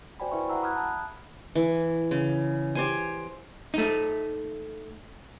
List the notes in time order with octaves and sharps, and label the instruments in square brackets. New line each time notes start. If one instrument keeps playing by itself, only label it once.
[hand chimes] F#4 C5 D5 G5 G#5 B5
E4 F#4 B4 E5 B5 C#6
E5 F#5 A#5 E6
B5 D#6 F6 F#6 G#6
A5
[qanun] E3
C#3
G4 C5 G#5
[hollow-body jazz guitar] A3 D#4